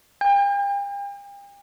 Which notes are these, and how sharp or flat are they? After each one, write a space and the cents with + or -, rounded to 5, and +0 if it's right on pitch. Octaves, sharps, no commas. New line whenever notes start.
G5 +40